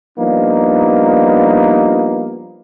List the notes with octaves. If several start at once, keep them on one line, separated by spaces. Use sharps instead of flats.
F3 G3 A#3 B3 D4 D#4